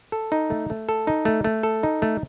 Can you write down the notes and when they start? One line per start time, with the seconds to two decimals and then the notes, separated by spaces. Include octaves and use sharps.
0.12 A4
0.32 D#4
0.50 A3
0.70 A3
0.89 A4
1.07 D#4
1.25 A3
1.44 A3
1.63 A4
1.83 D#4
2.02 A3